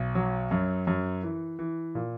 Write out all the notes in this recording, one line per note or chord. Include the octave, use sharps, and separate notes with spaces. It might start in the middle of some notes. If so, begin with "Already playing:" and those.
Already playing: B1
F#3
F#2
F#2
E3
E3
A#2